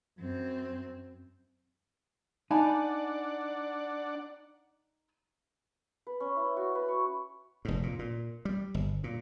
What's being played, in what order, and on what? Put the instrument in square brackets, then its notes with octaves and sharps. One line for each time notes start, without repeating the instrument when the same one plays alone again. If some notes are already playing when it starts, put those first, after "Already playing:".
[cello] F#2 C4
[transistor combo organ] D4 D5 F#5 [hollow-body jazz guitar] D#4 [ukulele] G#5 A5 B5
[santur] B4
C#4
E4
F#4
B4
C#5
[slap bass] F1 G#2
A#2
A#2
G3
G1
A#2